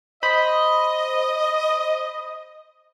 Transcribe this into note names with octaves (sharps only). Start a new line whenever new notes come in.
C5 D#5 B5